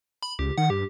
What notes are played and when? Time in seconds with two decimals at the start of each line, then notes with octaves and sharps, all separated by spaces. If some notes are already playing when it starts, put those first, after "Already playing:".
0.23 B5
0.39 C#2 G4
0.58 D#3 F#5
0.70 G2 G4